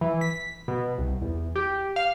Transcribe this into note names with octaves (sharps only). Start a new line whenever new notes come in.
E3
B6
B2
C2
E2
G4
F5